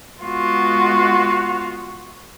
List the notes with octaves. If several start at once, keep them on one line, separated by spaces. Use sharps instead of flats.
G#3 B3 F4 F#4